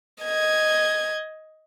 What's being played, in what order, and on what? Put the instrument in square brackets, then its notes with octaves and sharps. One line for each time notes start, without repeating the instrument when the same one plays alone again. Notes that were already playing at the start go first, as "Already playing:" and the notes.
[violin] D#5 G#6